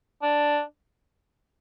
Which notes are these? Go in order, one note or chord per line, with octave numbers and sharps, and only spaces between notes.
D4